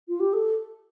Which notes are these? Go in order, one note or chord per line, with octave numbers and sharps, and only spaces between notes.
F4
G4
A4